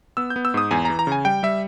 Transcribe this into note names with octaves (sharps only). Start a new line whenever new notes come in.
B3 E6
G6
B3
E6
G#2 D#6
E2 G#5
A#5
E3
A#5
C#3 G#5
G3 G5
G3 E5